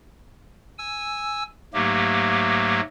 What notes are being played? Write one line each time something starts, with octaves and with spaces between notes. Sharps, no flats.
G#5 E6
G#2 F#3 A3 A#3 G4